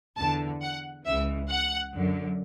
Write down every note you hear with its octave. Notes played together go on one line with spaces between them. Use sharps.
E2 D3 A5
F#5
C#2 C#3 E3 E5
F#5
F#2 D3